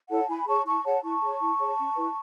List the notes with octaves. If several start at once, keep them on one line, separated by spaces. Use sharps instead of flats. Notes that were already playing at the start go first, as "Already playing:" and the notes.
E4 A4 C#5 F#5 A5
E4 G#5 B5
G#4 C#5 A5 C#6
E4 A5 C#6
G#4 C#5 F#5 A5
E4 A5 C#6
G#4 C#5
E4
G#4 C#5
C#4
E4 B4